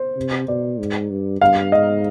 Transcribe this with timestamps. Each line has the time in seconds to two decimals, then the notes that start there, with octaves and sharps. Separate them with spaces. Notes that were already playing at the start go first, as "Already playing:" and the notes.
Already playing: C5
0.16 C3
0.48 B2 D5
0.79 G#2
1.10 G2
1.41 G2 F5
1.72 G#2 D#5